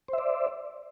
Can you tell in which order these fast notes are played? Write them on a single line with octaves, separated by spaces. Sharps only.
C5 E5 D5